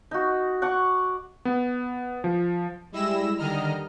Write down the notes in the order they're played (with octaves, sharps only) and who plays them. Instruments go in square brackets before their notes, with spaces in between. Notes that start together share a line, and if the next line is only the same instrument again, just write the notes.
[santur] D#4 F#4
F#5 C#6 D6
[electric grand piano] B3
F3
[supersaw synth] G3 G#3 E4 E6 A#6 E7
D3 D#3 G3 D#5 A#5 F6